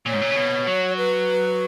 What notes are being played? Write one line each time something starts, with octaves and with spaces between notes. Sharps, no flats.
A#2 C#5
G#2
A#2
C#3
B2
F#3
B4